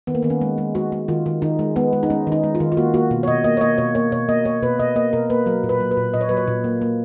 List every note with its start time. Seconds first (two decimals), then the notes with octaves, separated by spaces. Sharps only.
0.07 D#3 B3
0.15 A#3
0.22 D#3 B3
0.30 C#4
0.41 G#3
0.58 G#3
0.75 G#3 F#4
0.92 G#3
1.08 D#3 F4
1.26 D#3
1.42 D#3 D#4
1.59 G#3
1.76 G#3 B3
1.93 G#3
2.03 D#4
2.10 G#3 C#4
2.27 D#3
2.32 D#4
2.43 G#3
2.55 F4
2.60 D#3
2.72 F4
2.77 A#3 F#4
2.94 A#3 F#4
3.11 B2
3.23 C#5
3.27 B2 D#5
3.44 A#3 D#5
3.57 C#5
3.61 A#3 D#5
3.78 B2 C#5
3.95 A#3 C#5
4.12 B2 C#5
4.29 A#3 D#5
4.45 A#3 C#5
4.63 B2 B4
4.80 B2 D#5
4.96 A#3 D#5
5.13 B2 A#4
5.30 A#3 B4
5.46 F#3 A#4
5.64 A#2
5.69 B4
5.80 F#3
5.91 B4
5.97 A#2
6.14 A#2 D#5
6.21 C#5
6.29 F#3 B4
6.37 C#5
6.48 A#2
6.64 A#3
6.82 A#3